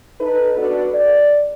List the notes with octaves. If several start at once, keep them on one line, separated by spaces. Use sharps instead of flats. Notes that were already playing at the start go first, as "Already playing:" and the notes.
D#4 A4 B4
B3 D4 F#4 A4 B4 D5
D5